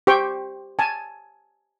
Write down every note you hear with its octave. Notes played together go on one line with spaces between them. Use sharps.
G4 C5 G5 C#6
G#5 A5